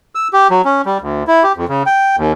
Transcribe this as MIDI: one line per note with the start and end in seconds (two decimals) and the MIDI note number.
0.15 0.28 88
0.33 0.48 67
0.50 0.62 54
0.65 0.82 61
0.86 0.98 55
1.01 1.23 38
1.27 1.43 64
1.43 1.52 67
1.57 1.65 41
1.69 1.83 49
1.86 2.16 79
2.17 2.32 39